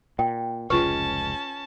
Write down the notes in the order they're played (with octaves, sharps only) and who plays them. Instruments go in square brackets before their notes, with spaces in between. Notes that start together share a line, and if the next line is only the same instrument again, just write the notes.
[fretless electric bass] A#2 [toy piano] G5
[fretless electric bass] F1 C#2 G#3 [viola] C#4 A5 [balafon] F4 C#6 [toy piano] B4